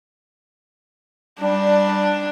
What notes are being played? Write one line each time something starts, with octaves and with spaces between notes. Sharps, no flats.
G3 D4